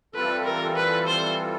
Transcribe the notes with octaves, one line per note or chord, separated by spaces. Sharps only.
E3 G3 C4 F4 A4 B4
A#4
B4
C5